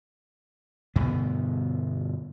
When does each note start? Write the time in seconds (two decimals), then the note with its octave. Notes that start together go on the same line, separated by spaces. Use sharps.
0.96 G2 B2 D3 B3